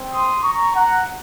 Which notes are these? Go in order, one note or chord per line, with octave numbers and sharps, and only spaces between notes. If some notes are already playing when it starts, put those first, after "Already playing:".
Already playing: C4
C6 D#6
A#5 C#6
F#5 A#5